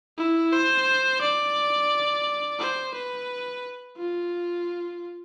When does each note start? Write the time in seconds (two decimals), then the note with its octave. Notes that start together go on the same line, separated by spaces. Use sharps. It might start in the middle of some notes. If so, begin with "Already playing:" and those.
0.18 E4
0.53 C5
1.21 D5
2.59 C5
2.94 B4
3.97 F4